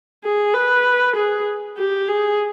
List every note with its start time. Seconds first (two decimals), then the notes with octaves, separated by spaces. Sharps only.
0.24 G#4
0.54 B4
1.15 G#4
1.77 G4
2.08 G#4